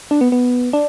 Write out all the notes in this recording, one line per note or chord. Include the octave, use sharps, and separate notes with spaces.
D4
B3
B3
D4